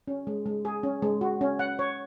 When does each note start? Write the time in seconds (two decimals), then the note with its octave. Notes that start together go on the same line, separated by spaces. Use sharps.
0.08 C#4
0.27 G#3
0.46 G#3
0.65 G#4
0.83 C#4
1.02 G#3
1.21 F#4
1.41 C#4
1.59 F#5
1.79 C#5